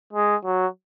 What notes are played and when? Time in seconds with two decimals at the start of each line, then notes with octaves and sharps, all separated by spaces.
0.13 G#3
0.44 F#3